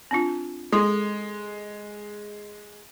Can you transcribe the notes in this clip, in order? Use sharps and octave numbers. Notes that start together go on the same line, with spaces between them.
C4 D4 F4
G#3 A4 C6